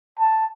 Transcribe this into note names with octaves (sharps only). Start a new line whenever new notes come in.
A5